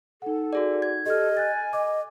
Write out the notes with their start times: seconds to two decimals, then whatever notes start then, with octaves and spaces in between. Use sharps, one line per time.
0.22 D#4 A4 F#5
0.53 F#4 G#4 D5
0.82 G#6
1.06 G4 A4 D#5 F6
1.37 G#5 F#6 A6
1.73 D#5 D6